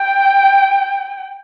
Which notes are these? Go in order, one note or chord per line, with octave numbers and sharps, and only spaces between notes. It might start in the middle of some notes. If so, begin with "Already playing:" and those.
Already playing: G5